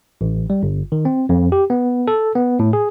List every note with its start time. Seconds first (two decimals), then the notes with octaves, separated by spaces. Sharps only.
0.21 A1
0.50 G3
0.63 G1
0.92 D#3
1.05 C4
1.29 F2
1.52 G4
1.70 B3
2.08 A4
2.35 B3
2.59 A2
2.73 G#4